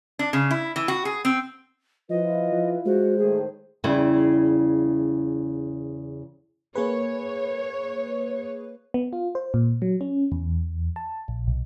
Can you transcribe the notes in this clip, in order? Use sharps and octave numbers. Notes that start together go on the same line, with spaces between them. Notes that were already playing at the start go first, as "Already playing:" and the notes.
D4
C#3
E4
E3
F#4
G#4
C4
F3 E4 F4 B4 D#5
F3
G#3 F#4 C5
A2 D#3 G#4
E2 C#3 G3 E4 E5
A#3 G#4 B4 C#5
B3
F4
C5
A#2
F#3
C#4
E2
A5
A#1
B1